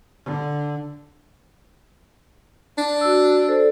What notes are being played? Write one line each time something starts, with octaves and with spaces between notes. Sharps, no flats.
D3
D4
F#4 E6
A4 C5 D5